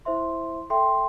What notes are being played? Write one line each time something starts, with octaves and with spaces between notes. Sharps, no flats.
E4 C5 E5 C6
A4 E5 G5 C6